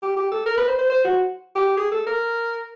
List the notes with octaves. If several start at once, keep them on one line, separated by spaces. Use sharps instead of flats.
G4
G4
A4
A#4
B4
C5
C5
C5
F#4
G4
G#4
A4
A#4